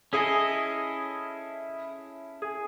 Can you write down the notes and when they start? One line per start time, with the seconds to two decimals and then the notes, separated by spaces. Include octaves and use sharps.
0.13 C#4 E4 G#4 A4 D#5
2.42 G#4